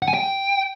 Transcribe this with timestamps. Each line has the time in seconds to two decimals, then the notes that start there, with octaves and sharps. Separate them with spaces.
0.02 F#5
0.08 G#5
0.14 G5